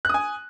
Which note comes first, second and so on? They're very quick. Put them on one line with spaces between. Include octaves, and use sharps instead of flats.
F#6 D#6 G#5